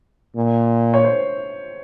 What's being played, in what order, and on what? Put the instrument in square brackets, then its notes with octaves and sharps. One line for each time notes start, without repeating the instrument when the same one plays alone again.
[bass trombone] A#2
[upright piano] C#5
C5